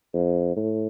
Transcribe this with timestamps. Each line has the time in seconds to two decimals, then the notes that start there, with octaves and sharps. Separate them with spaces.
0.14 F2
0.56 A2